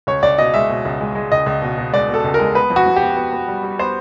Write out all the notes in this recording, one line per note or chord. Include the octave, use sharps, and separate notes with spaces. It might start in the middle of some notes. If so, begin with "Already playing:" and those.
C#2 C#5
C#2 D5
B2 D#5
G#3 E5
B2
C#2
G#3
G#3
C#2 D#5
C#2
B2
B2
G#3 D5
B2 A4
C#2
A#4
G#3
B3 B4
F2
F#4
F2
G4
B3
B3
B3
G3
G3
B3 C5